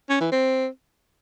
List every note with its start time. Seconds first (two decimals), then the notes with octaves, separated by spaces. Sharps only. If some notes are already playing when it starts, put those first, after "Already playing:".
0.10 C#4
0.21 E3
0.32 C4